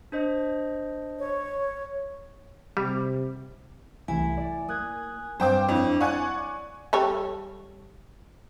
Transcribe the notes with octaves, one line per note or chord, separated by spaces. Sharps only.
D4 C5 D#5
C#5
C3 G3
C2 E3 A3 E4 G#5
D5
A#3 D#6 F#6 G#6
G2 C4 C5 D5 F5 G5 D6
F2 C4 D4 E4 C#5
D5 F5 F#5 G#5 C#6
G3 A4 C#5